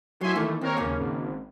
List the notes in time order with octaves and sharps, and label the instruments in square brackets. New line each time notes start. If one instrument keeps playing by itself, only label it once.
[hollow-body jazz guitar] F#3 E4 [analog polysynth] E5 G#5 C6
[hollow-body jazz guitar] D#3 E3 A#3 [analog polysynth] A3
[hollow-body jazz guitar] D#2 [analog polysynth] C4 A#4 C#5
[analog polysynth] D#2 C#4 [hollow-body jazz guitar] C#3 A#3
[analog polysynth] G#1